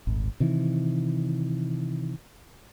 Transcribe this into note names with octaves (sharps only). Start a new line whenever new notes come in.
D#1 G#1
C3 D#3 E3